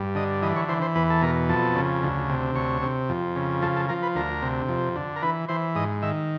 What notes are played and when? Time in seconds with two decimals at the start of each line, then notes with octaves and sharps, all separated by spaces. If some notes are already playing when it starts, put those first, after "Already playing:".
Already playing: G2
0.15 D3 D#5
0.42 E3 D#5
0.56 C#5
0.68 E3 C5
0.82 C5
0.95 E2 B4
1.10 A4
1.22 B2 A#4
1.49 F2 A4
1.75 C#3
2.03 D2
2.29 C3
2.55 D2 C#5
2.82 C3
3.09 F2
3.36 C#3
3.62 F3 A4
3.76 A4
3.89 F3 A#4
4.03 B4
4.15 D2 A#4
4.42 C3
4.69 F2
4.96 D3
5.16 A#4
5.22 E3 B4
5.48 E3 C5
5.75 G#2 D#5
6.02 D#3 E5